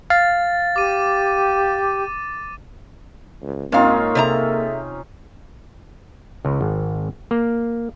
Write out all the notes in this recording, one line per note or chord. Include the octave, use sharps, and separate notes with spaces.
F5 A6
G4 D6 D#7
C#2
G#2 A#3 C4 C#4 D#4 F4 F5
C3 G#4 A4 D5 E5 A#5
C#2
G#1
A#3